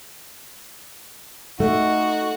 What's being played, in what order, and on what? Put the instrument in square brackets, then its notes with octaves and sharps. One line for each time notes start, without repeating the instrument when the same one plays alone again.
[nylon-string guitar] A3 [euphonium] D#4 [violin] F#4